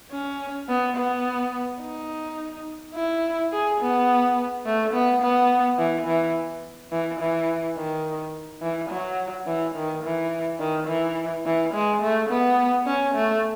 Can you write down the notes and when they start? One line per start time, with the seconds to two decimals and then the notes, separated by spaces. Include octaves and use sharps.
0.12 C#4
0.69 B3
0.97 B3
1.81 D#4
2.95 E4
3.52 G#4
3.81 B3
4.66 A3
4.94 B3
5.22 B3
5.78 E3
6.07 E3
6.92 E3
7.20 E3
7.77 D#3
8.62 E3
8.90 F#3
9.46 E3
9.75 D#3
10.04 E3
10.60 D#3
10.88 E3
11.46 E3
11.74 G#3
12.02 A3
12.30 B3
12.86 C#4
13.15 A3